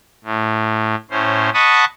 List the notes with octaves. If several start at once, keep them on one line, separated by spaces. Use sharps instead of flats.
A2
A2 C#4 C5
D#5 F#5 A5 B5 C#6 D#6